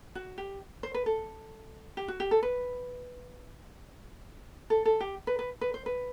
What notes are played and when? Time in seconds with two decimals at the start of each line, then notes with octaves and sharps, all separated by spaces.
0.15 F#4
0.38 G4
0.83 C5
0.94 B4
1.06 A4
1.97 G4
2.08 F#4
2.20 G4
2.31 A4
2.43 B4
4.70 A4
4.85 A4
5.00 G4
5.27 B4
5.39 B4
5.61 B4
5.74 C5
5.86 B4